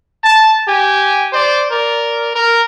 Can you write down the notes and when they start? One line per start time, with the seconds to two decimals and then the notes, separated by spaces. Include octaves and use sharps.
0.23 A5
0.68 G4 G#5
1.33 C5 D5
1.71 A#4 D5
2.34 A#4